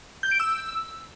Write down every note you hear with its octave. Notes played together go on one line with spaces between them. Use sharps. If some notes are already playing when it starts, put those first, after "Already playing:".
G6
D7
E6